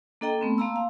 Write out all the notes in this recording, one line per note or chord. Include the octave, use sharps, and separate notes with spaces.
A#3 D4 A4 D#5 G5 A#5
A3 B3 C4
A#3 F5 A5 A#5 C6 E6
F5